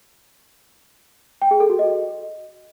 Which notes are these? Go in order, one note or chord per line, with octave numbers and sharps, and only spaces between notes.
G5
G#4
A4
F#4
D#5